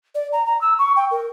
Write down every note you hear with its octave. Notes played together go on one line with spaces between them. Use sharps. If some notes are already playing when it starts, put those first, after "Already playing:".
D5
A#5
A#5
E6
C#6
G5
A#4